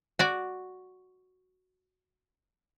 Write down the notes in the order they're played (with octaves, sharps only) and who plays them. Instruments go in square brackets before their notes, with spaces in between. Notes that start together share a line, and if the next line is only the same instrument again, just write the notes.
[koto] F#4 D5